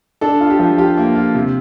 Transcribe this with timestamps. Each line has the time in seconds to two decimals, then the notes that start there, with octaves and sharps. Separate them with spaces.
0.21 D4 A4
0.41 F4
0.50 G4
0.59 F3
0.78 F4 G4
0.98 A#3
1.15 F4
1.35 C3